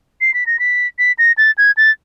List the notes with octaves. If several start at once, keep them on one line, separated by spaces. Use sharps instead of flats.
C7
B6
A#6
B6
B6
A#6
A6
G#6
A6